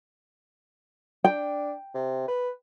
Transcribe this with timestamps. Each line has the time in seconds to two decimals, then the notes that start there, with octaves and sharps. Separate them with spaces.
1.24 D4 G5
1.94 C3
2.28 B4